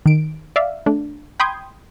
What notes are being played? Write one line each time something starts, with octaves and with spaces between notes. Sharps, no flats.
D#3 D7
D5 E5 F5
A3 D4
G5 B5 C6 D#6 G6 G#6